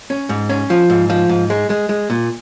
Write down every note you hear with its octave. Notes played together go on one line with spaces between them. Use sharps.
C#4
G#2
C#4
F3
G#2
F3
G#2
G#3
G#3
G#3
A#2